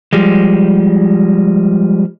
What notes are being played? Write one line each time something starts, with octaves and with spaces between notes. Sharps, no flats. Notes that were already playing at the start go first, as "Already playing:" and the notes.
F3 G3 G#3